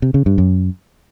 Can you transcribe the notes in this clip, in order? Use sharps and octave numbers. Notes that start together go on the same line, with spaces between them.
C3
C#3
G2
F#2